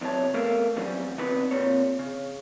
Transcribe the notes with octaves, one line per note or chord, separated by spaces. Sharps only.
E2 C3 F#3 C#5 A5
A3 B3 A4 A#4 F5
E3 F#3 G3 C4 C#4
D3 B3 C4 D#4 B4
A#2 C4 C#5
C#3